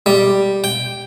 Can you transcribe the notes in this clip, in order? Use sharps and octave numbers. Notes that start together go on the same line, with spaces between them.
G3
G5